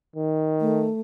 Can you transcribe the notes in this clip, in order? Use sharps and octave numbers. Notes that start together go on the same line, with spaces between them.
D#3
A3